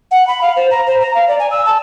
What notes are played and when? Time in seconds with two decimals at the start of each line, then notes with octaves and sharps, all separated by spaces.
0.11 F#5
0.28 B5
0.42 F5
0.56 C5
0.71 A#5
0.87 C5
1.01 A#5
1.15 F5
1.28 D5
1.39 G#5
1.51 E6
1.66 A5